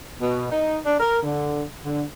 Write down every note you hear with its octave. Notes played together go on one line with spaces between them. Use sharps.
B2
D#4
D4
A#4
D3
D3